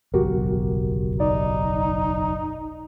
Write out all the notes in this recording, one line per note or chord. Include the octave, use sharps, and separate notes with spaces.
F#1 B1 E2 F#4 G4 A#4
D#4 D5